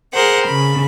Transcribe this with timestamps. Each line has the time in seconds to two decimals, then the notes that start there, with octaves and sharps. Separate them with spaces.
0.13 G#4 A#4 C5 F#5
0.45 C#3 B5